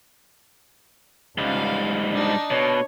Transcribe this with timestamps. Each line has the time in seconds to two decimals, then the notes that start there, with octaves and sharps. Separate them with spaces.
1.38 C#2 G#2 G3 F5
2.12 D4 D#4
2.51 B2 C#5